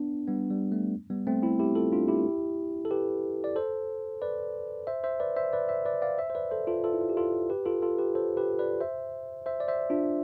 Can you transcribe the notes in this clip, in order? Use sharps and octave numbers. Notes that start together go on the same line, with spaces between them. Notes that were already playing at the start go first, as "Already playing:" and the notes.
Already playing: B3 D4
G3 B3
G3
A3
G3 B3
A3 C4
C4 E4
E4 G4
F4 A4
D4 F4
E4 G4
A4
G4 B4
D5
A4 C5
B4 D5
C5 E5
C5 E5
B4 D5
C5 E5
B4 D5
C5 E5
B4 D5
D5 F5
C5 E5
C5
B4 D5
A4 C5
F4 A4
F4 A4
E4
F4
G4
F4 A4
G4 B4
F4 A4
F4 A4
G4 B4
A4 C5
G4 B4
B4 D5
C5 E5
C5 E5
D5
C5 E5
D4 F4